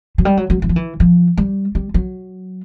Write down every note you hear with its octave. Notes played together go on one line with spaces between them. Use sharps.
F#3
G3
F#3
F#3
E3
F3
E3
F3
G3
G3
F#3